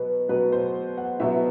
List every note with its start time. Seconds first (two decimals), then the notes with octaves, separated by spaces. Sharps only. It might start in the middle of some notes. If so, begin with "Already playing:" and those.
Already playing: B2 F#3 B3 B4
0.29 B2 F#3 B3 B4
0.52 C5
0.97 F#5
1.20 B2 F#3 B3 E5